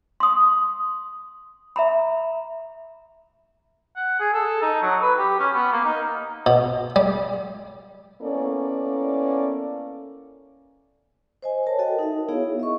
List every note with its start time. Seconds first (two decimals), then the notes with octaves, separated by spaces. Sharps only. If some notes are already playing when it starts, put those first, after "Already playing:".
0.20 C6 D#6
1.76 E5 A#5 B5
3.96 F#5
4.20 G#4
4.33 A4
4.62 D#4
4.82 F#3
5.02 B4
5.18 G4
5.40 C#4
5.55 B3
5.73 A#3
5.85 D#4
6.46 B2
6.96 G3
8.21 A#3 B3 C#4 E4 A4 D5
11.42 C5 D#5 G#5
11.67 A#4 C#5 A5
11.79 F#4 A4 D#5 G5
11.99 D#4 A#4 E5
12.29 B3 E4 G#4 C#5 E5 F5
12.60 D#5 E5 C#6